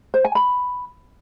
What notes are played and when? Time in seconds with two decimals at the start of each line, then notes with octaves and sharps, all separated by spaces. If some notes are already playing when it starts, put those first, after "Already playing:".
0.14 C5
0.25 G#5
0.35 B5